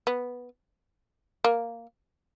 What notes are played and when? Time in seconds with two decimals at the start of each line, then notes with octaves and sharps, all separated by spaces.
0.07 B3
1.44 A#3